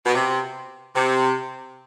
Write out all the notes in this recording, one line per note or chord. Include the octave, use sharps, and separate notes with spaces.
B2
C3
C3